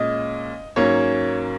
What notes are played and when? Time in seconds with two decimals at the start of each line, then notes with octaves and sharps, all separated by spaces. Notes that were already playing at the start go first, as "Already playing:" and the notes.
Already playing: A#2 G#3 C#4 D#5
0.76 G#2 F#3 A#3 C#4 C#5